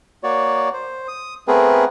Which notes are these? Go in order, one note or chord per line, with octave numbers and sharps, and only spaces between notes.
A#3 F#4 C#5 D5
C5
D#6
A3 B3 C4 G#4 A#4 B4